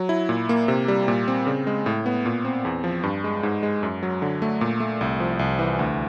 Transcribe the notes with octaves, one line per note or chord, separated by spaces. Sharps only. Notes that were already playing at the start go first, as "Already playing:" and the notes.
Already playing: F#3
E4
A#2
A#3
C3
G3
A#2
C4
C#3
G#3
A2
B3
A#2
C4
E2
F3
G2
G#3
G#2
G#3
F#2
F#3
D3
A3
A#2
A3
C2
F3
C2
E3
D2